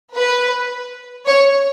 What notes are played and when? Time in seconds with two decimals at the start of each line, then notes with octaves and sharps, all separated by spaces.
0.13 B4
1.26 C#5